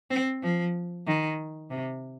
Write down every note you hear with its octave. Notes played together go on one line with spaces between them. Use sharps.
C4
F3
D#3
C3